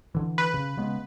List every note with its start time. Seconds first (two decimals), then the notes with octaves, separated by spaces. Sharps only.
0.15 D3 E3
0.38 B4
0.54 C#3
0.77 C#3 G#3 B3